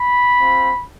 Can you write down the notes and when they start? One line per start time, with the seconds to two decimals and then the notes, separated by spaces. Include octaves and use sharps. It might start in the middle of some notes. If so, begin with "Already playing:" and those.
Already playing: B5
0.39 C4 F4